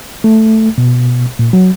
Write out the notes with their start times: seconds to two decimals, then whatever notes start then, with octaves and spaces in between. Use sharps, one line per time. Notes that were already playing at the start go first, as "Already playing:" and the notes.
0.24 A3
0.78 B2
1.39 A#2
1.53 F#3